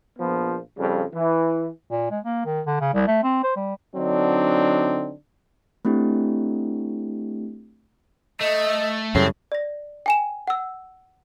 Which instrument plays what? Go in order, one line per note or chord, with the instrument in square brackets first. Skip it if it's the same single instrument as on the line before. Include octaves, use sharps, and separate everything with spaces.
[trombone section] A#1 F3 B3
F2 C#3 G3
E3
[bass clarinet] A#2
G#3
A#3
D#3
D3
C#3
C2
A3
C4
C5
G3
[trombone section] D3 F#3 C4 D4 D#4
[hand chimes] A3 C4 D4 E4 G4
[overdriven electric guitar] A3 [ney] D#5
[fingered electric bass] F#2 C#3 G3 [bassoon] A2 [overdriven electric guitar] C4 [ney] G#4
[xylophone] D5 A#6
G5 G#5 E7
F#5 E6